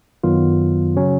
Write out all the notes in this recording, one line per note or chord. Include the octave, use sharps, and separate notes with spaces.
F#2 D#3 F#3 B3 F4
C#3 F#3 C#4